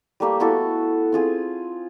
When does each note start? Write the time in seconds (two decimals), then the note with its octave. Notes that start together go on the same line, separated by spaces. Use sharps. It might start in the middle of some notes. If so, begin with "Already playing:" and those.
0.20 G3 A3 A#3 G4
0.40 B3 E4 F#4 A4
1.12 C4 F4 G#4